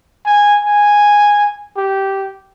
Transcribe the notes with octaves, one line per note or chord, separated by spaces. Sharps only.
G#5
G#5
G4